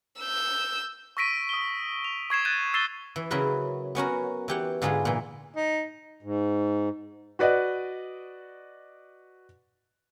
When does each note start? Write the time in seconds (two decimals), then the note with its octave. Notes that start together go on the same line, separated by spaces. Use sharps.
0.20 E6 G6
1.17 C#6 E6 A#6 B6 D7 D#7
1.49 D#6 G7
2.04 F7
2.30 C#6 G#6 C7 E7
2.45 F#6 G6 A6 D#7 E7
2.74 E6 A6 C7 D#7 E7 G7
3.16 E3
3.31 C#3 F#3 E4 A#4 B4 C6
3.95 B3 C#4 F#4 A#4
4.48 E3 G4 F#5
4.82 G#2 D3 F4 G#4 A5 B5
5.05 A#2 E3
5.56 D#4
6.23 G#2
7.39 F#4 B4 D5 D#5 F#5